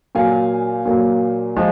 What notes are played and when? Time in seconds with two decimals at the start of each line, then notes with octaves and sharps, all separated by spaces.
0.15 A#2 F#3 A#3 F5 G#5
0.85 A#2 F#3 A#3
1.56 F3 G#3